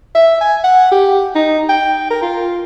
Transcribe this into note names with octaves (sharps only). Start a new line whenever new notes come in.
E5
G#5
F#5
G4
D#4
G5
A#4
F4